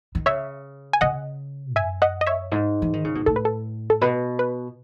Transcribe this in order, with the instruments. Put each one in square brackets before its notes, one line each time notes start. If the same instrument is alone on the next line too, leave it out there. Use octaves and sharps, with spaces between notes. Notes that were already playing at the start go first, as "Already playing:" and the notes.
[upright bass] D#3
[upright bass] C#3 [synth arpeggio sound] C#5 E5
[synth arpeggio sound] G#5
[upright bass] C#3 [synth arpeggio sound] D#5 F#5
[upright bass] F#2 [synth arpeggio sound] E5 G#5
[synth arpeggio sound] D#5 F#5
D#5
C#5 E5
[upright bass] G#2
E3
D#3
C#3
B2
[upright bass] A2 [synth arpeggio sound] A4
[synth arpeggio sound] B4
A4
A4
[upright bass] B2 [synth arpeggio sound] B4
[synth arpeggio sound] B4